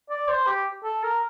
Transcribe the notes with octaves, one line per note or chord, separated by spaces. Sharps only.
D5
C5
G4
A4
A#4